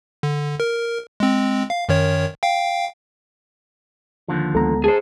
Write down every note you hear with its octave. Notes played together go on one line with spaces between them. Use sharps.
D3
A#4
G#3 C4
F5
F#2 D#3 C#5
F5 G5
D#2 D3 F3
D2 G#3 B3 A4 A#5
G#4 C5 A5